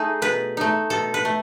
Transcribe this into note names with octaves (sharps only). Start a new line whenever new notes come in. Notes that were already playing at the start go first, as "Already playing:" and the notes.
Already playing: A3 D#4 G#4
B2 B4
A3 D#4
B2 A4
B4
A3